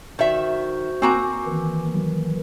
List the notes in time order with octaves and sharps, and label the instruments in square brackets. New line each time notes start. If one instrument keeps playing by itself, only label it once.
[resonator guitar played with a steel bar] D#3 E5 [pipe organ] F#4 C5
[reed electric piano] A#3 G#5 D6 [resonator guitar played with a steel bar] C4 F#4 A#5
[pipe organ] D#3 E3
[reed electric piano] F#3 A#3